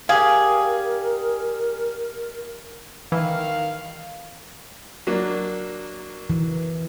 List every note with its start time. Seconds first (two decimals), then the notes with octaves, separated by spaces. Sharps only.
0.09 G4 G#4 A#4 D5 F5 G#5
3.12 D#3 E3 F5
5.07 F#3 A#3 D4
6.30 E3